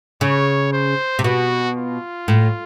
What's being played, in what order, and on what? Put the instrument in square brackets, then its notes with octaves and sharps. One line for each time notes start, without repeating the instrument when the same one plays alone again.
[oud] C#3 [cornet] C#5
[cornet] C5
[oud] C3
[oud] B2 [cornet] F#4
[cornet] F4
[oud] A2